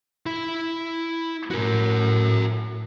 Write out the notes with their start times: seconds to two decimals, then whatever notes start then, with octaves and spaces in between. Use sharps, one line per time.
0.26 E4 B5
1.51 A2 F#4 A#4